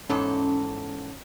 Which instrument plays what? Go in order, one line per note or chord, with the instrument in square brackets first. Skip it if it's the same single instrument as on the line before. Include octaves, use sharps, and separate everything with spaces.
[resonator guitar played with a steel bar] E2 G#2 A4 [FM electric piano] C#4